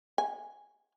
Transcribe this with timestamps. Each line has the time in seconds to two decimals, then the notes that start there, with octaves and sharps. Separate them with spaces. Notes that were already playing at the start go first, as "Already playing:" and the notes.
0.18 G#5